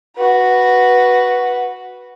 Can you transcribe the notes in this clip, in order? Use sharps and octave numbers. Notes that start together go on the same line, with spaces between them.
F#4 B4